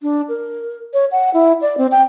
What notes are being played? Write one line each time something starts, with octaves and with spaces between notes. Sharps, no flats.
D4
A#4
C#5
F#5
E4
D5
C4
G5